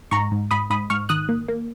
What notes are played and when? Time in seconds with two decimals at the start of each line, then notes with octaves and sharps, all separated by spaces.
0.11 G#2 A#5 C#6
0.32 G#2
0.51 G#2 B5 D#6
0.70 G#2 B5 D#6
0.90 G#2 C#6 F6
1.09 D#3 D#6 F#6
1.29 A#3
1.48 A#3